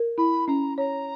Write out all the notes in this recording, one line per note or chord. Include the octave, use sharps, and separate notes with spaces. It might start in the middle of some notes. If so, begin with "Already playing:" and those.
Already playing: A#4
E4 B5
C#4 A#5
C#5 A#5